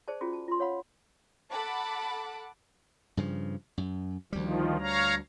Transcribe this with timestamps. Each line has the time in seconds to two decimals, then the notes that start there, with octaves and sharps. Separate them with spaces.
0.08 G#4 C5 D5 A5
0.21 C#4 F4 F#4 G#4
0.33 A5
0.48 F4 C6
0.60 C#5 F5 F#5 B5
1.52 A4 F#5 A5 B5 D6
3.17 G2 C#3 F3
3.78 F#2
4.33 D2 D#3 F3 G3
4.81 C#5 F5 A#5